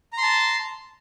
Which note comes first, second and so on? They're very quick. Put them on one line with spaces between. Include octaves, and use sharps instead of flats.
A#5 C6 A5